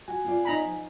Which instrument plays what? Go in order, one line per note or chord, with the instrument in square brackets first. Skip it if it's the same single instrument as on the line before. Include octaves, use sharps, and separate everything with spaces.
[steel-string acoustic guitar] F#4 [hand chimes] G#5
[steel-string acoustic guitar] B3 F4 D5
[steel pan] D#4 A#5 B5
[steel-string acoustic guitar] F3